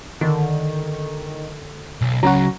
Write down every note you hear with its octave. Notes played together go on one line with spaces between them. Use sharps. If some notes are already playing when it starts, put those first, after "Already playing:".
D3 D#3
B1
C#2 F#3 C#4 F#4 A#5